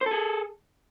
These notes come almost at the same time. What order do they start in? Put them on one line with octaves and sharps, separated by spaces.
C5 A4 G#4